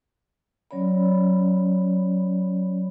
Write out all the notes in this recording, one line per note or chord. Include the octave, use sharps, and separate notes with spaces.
F#3 C#4 C#5 D5 B5